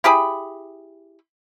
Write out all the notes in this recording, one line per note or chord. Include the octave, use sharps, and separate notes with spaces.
E4 G4 G#4 B5